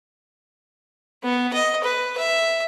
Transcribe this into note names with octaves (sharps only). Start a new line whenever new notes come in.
B3
D#5
B4
E5